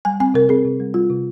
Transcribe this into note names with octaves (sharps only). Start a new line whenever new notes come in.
G3 G#5
C4 G#5
C3 A#4
C4 G#4
C3
G3
G3 F4
C3